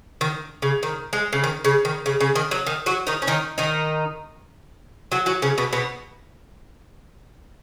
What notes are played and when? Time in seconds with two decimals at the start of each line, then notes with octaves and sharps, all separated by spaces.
0.21 D#3
0.62 C#3
0.83 D#3
1.13 G#3
1.33 C#3
1.44 D#3
1.64 C#3
1.85 D#3
2.06 C#3
2.20 C#3
2.35 D#3
2.51 F#3
2.66 D#3
2.86 F#3 F#4
3.07 D#3 D#4
3.22 C#4
3.27 D#3 D#4
3.58 D#3 D#4
5.12 F#3 F#4
5.26 F#3 F#4
5.42 C#3 C#4
5.58 B2 B3
5.73 B2 B3